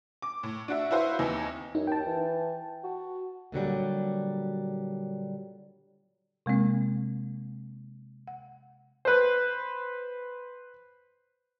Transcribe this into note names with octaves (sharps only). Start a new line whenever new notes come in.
D6
A2
D4 F#4 E5
E4 F#4 B4 C5 E5 F5
D#2 E3 C4 D#4
F#2 D#4
D#2 G5 A5
E3
F#4
A#2 D3 F#3 G3
C3 G#3 A#3 C4
F#5
B4 C5